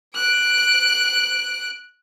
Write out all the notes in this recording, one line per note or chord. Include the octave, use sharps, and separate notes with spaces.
F#6 D7